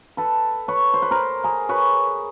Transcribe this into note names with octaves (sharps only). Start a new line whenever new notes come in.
A4 B4
B4 C#5
C5
B4
A#4 C5
G#4 A#4
B4 C#5